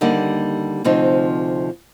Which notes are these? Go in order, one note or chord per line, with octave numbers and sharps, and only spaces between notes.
D#2 D3 G3 A#3 D#4
D2 C3 F3 C4 D#4